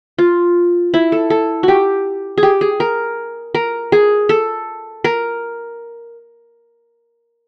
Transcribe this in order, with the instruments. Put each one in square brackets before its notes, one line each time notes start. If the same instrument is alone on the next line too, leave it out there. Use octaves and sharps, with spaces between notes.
[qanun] F4
E4
A4
A4
F#4 G4
G#4
G4
G#4
A#4
A#4
G#4
A4
A#4